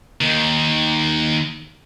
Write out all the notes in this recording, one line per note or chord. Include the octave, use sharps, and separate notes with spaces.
D#2 D#3